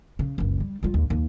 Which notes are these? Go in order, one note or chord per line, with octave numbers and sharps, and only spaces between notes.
C#3
F#1 C#2
G3
G3 F4
D#2
D#2